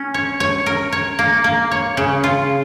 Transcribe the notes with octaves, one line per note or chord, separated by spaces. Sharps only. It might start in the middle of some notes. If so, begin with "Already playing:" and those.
Already playing: C#4
C#5
C#5
A#4
C#5
A#3
A#3
C#5
C#3
F4